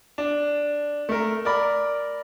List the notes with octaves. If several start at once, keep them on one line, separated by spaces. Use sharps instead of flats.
D4
A3 A#4
A#4 D5 B5